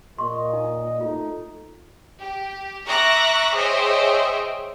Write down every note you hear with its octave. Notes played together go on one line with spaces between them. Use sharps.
A#2 D#5 C6 C#6
D#4
A3 D#4 F4
G4
E5 A#5 C#6 D6 F#6 A#6
G#4 C5 C#5 D#5 E5 G5